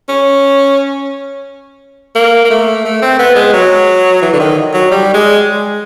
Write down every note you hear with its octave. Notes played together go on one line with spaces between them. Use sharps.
C#4
A#3
A#3
A3
A3
C4
B3
G#3
F#3
E3
D3
D#3
F#3
G3
G#3